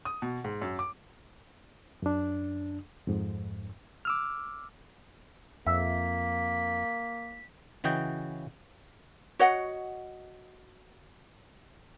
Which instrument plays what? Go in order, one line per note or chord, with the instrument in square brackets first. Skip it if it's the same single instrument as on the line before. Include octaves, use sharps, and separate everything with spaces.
[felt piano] D#6
B2
G#2
F#2
D6
[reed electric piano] F#2 D4
F2 G#2
D6 E6 F6
[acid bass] F2 [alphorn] A#3 [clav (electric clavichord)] E5 [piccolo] B6
[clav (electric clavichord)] C#3 E3 F#4 D#5 G5
[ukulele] F#4 C#5 D#5 F#5